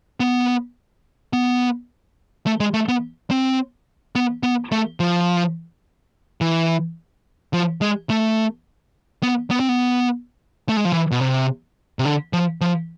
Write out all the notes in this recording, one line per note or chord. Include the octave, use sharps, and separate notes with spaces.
B3
B3
A3
G#3
A3
B3
C4
B3
B3
A3
F3
E3
F3
G#3
A3
B3
B3
C4
B3
A3
G#3
F3
E3
B2
C3
C3
D3
F3
F3